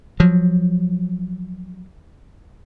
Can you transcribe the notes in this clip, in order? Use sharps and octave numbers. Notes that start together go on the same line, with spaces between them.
F3 F#3